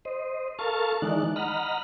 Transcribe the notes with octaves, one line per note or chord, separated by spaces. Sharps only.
C5 D#5
A4 A#4 F5 A5 C#6
D#3 E3 G#3 D#4 D5 F#6
D#5 F#5 A#5 B5 F6